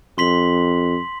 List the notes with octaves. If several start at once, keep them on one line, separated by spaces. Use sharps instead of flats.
F2 C6 B6 F#7